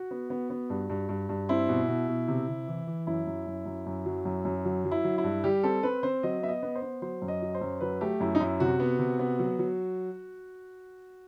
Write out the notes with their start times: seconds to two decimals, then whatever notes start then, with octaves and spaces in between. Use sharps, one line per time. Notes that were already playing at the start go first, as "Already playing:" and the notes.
Already playing: F#4
0.11 B3
0.30 B3
0.50 B3
0.70 G2
0.90 G2
1.09 G2
1.29 G2
1.49 C4 E4
1.69 B2
1.88 B2
2.08 B2
2.28 C3
2.48 C3
2.68 E3
2.87 E3
3.07 F#2 E4
3.27 F#2
3.46 F#2
3.66 F#2
3.86 F#2
4.06 F#3
4.25 F#2
4.45 F#2
4.65 F#3
4.85 F#3
4.91 E4
5.04 F#3
5.18 E4
5.24 G2
5.44 G3 G4
5.63 C4 A4
5.83 C4 B4
6.03 C4 C5
6.23 F#3 D#5
6.43 B3 E5
6.49 D#5
6.63 B3
6.75 C5
6.82 B3
7.02 F#3 C5
7.22 F#2
7.28 D#5
7.42 F#3
7.55 C5
7.61 F#2
7.81 F#3 B4
8.01 A3 G4
8.20 F#2 E4
8.35 D#4
8.40 F#2 E4
8.60 C3 F#4
8.80 B3
8.99 C3
9.19 B3
9.39 F#3
9.59 F#3